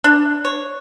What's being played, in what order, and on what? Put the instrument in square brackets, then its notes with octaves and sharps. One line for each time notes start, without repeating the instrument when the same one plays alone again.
[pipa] D4
C#5